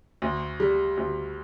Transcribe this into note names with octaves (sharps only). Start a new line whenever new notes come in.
D2
G3
D2